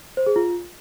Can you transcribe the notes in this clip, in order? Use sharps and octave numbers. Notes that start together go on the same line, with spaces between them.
C5
G#4
F4